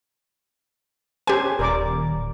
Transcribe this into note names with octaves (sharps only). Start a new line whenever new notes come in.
C#4 G4 C5 G#5
D#1 A#4 D5 D6